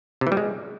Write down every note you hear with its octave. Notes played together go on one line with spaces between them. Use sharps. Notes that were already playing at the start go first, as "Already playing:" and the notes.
C3
E3
G3
G#3